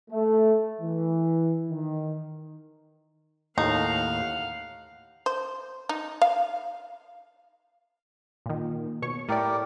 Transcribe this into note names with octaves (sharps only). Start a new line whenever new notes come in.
A3
E3
D#3
D#2 A2 D#4 F5 F#5
C5
D#4
F5
A#2 D#3
B2 C#5 C#6
A2 G4 A#4 D5